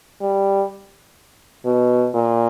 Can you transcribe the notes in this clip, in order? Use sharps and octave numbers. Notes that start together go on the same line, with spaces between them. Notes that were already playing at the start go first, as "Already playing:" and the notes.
G3
B2
A#2